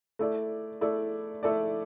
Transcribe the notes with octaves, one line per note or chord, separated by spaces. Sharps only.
A3 E4 A4 D5
A3 E4 A4 D5
A3 E4 A4 D5